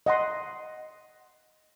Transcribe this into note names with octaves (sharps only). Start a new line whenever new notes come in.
D#5 F#5 C6